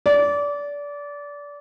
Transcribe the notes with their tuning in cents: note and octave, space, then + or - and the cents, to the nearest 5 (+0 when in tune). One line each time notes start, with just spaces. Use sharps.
D5 -25